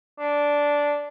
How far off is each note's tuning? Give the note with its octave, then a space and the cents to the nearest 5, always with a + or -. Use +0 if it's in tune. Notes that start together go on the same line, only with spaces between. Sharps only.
D4 -10